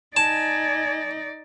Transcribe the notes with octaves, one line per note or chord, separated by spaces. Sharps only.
D#4 D5 G#5 A5